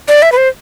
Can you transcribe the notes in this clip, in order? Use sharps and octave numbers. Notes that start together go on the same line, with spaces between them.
D5
E5
B4
C5